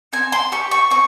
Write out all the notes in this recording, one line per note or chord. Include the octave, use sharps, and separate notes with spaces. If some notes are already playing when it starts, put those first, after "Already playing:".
C4 G#5
C6
G4 C#6
C#6
C4 C#6